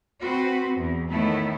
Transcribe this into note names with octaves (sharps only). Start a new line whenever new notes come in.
C4 F#4 B4 C5
E2
A2 D#3 A3 B3 E4